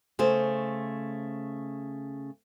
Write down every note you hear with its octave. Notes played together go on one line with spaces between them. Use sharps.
C#3 A3 C5